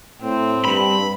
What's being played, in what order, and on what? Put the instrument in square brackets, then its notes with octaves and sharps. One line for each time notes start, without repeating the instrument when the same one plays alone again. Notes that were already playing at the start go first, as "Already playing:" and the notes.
[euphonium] A2 [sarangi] C4
[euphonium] G2 [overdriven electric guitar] B5